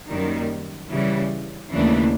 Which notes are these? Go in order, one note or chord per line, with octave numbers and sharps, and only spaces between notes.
F#2 D#3 G3 A#3
C#3 E3 G3
D#2 C#3 E3 A3 D4